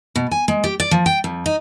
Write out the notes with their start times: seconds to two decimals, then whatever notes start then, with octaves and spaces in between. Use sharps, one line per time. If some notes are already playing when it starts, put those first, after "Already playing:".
0.16 B2
0.31 G#5
0.48 G#3
0.64 G4
0.80 D5
0.91 F3
1.06 G5
1.24 F2
1.46 D#4